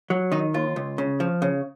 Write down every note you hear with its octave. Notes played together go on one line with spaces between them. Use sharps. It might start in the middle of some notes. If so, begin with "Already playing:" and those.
F#3
D#3 D#4
D#2 F4
C#2
C#3
F3
C#3